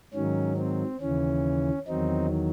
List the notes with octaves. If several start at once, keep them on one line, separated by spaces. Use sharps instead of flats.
G#2 D#3 F#3 C#4
C4
D#2 C#3 E3 C#4
E2 D#3 F#3 C4 D#4